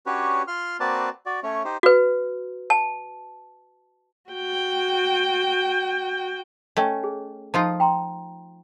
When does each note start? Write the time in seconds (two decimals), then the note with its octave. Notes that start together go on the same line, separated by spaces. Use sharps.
0.06 C#4 D4 F#4 G4 B4 C#5
0.48 F4 C6 F6
0.80 A#3 C4 F#4 B4 D5 A5
1.26 F#4 D5
1.43 A3 C#4 C#5
1.65 D#4 G4 C5
1.83 F#4 B4
2.70 A5
4.31 F#4 G5
6.77 A3 C#4 D#5 G5
7.04 G#4
7.54 F3 D#4 F4 A4 A5
7.80 G5 A#5 C6